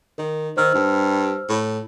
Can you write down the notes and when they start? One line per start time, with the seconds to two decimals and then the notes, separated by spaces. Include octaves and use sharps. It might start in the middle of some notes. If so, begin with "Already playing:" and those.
0.18 D#3 A#4
0.57 D#3 C5 E6 F6
0.74 G2
1.49 A2